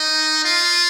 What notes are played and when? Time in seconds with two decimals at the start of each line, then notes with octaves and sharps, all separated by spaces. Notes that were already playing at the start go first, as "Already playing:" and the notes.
Already playing: D#4
0.44 F4